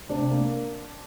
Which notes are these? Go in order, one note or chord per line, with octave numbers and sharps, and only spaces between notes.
C3 D4
A#3